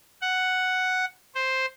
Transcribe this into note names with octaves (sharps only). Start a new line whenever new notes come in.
F#5
C5